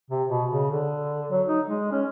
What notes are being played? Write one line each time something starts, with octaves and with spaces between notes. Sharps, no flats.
C3
B2
C#3
D3
F#3
D#4
G#3
C#4